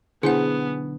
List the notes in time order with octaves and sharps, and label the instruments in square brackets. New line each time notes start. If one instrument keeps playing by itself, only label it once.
[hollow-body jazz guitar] B1 D3 [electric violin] B3 [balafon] E4 C5 F#5 [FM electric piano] G#4